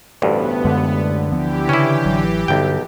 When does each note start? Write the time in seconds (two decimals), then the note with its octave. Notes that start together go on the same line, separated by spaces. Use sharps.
0.22 A1 D2 G2 B3
0.65 F#2 D3 G#3 A3
1.31 D2 E3 F3 B3 G4
1.69 C#3 C#4 E4
2.05 A1 F#3
2.48 B1 G2 D3 G5